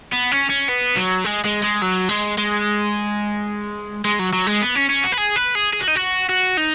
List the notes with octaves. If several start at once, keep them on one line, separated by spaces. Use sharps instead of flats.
B3
C#4
C#4
B3
F#3
G#3
G#3
G#3
F#3
G#3
G#3
G#3
F#3
F#3
G#3
B3
C#4
C#4
F#4
B4
G#4
B4
G#4
G#4
F#4
D#4
F#4
F#4
D#4